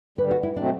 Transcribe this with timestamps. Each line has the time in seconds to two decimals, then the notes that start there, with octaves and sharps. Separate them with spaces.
0.18 G2 D3 G3 B4
0.31 F#4
0.43 E4
0.56 B2 F#3 A3 C4 D4